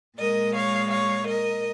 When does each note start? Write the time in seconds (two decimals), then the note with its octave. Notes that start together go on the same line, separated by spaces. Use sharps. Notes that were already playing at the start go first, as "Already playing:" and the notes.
0.19 A#2 G#3 A#4 D#5
0.55 C#5 F5
0.91 C#5 F5
1.28 A#4 D#5